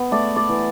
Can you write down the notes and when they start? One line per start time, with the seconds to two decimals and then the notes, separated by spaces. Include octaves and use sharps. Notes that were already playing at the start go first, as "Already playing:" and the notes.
Already playing: B3
0.11 A3 D5
0.36 D5
0.49 E3